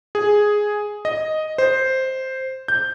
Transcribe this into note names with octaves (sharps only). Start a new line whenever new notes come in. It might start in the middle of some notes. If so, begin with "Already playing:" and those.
G#4
D#5
C5
G6